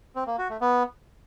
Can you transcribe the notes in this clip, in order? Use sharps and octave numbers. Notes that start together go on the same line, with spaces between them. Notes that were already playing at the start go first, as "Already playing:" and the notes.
C4
A#3
F#4
A3
B3